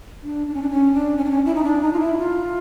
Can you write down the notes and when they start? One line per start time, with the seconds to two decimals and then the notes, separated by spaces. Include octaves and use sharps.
0.23 D4
0.47 D4
0.54 C#4
0.62 D4
0.70 C#4
0.94 D4
1.17 C#4
1.25 D4
1.31 C#4
1.45 E4
1.55 D#4
1.64 D4
1.82 D#4
1.93 F4
2.00 E4
2.18 F4